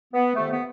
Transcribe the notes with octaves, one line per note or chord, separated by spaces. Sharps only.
B3
F2 C3 D#3 A3
B3